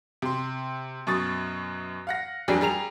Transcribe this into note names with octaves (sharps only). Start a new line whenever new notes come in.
C3 C6
F#2 B2 C#6 D#6 A6
F5 F#5 A#6
F#1 F2 F#3 G3 D4 G#4
G3 G#4 A#5 F7